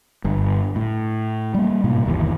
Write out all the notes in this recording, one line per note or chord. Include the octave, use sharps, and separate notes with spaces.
G1 G2
A2
G3 A#3
G#2 B2 A#3
G1 D#2 E3